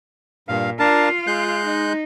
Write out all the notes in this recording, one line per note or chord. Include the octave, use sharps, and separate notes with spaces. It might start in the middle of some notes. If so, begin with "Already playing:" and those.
G2 A#2 F5
D4 F4 A#4 F5 A5
G#3 F#6 G6
D#4